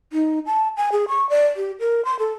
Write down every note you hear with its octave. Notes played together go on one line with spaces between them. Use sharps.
D#4
A5
G#5
G#4
C#6
D5
G4
A#4
C6
A4